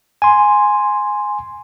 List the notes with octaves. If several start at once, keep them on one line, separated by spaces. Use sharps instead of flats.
G#5 C6